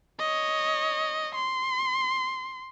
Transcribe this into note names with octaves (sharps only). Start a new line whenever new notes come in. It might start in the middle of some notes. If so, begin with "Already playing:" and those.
C#5 D#5
C6